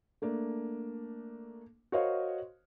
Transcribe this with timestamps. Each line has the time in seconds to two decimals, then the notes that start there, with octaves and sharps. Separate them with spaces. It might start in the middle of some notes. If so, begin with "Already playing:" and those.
0.22 A3 A#3 D4
1.92 F#4 A#4 C5 C#5 D#5 F5